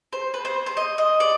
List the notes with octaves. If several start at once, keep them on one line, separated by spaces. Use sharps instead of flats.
C5
B4
C5
C5
D#5
D#5
D5